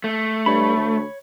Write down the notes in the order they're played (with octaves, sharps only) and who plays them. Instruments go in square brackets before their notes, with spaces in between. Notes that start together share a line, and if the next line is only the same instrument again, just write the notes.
[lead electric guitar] A3
[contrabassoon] G2 [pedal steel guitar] C#5 B5
[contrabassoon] D2